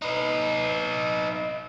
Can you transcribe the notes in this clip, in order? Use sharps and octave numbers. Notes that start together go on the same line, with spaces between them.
D#4 B4